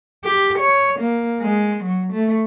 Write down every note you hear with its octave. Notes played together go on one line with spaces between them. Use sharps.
G4
C#5
A#3
G#3
F#3
A3